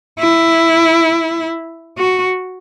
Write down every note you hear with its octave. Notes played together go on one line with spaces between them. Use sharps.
E4
F#4